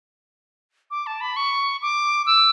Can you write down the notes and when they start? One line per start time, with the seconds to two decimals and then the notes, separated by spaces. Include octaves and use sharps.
0.91 D6
1.06 A5
1.21 B5
1.36 C#6
1.82 D6
2.26 E6